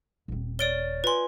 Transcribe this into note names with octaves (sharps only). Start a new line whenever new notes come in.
D#1 C4
C#5 D5 F6 A6 D7 G7
F4 B4 G#5 C6